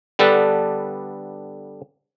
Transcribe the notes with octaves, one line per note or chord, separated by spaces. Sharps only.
D3 G3 B3 D4 A4 B4